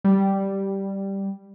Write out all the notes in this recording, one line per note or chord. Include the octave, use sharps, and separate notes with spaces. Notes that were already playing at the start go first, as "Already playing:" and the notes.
G3